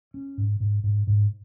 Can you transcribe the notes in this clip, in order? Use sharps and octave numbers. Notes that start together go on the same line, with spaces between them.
C#4
G#2
G#2
G#2
G#2